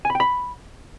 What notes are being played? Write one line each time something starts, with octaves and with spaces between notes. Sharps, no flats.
G#5
B5
G5
B5